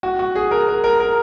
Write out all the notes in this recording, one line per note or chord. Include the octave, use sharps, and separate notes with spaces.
F#4
F#4
G#4
A#4
A#4
A#4
A#4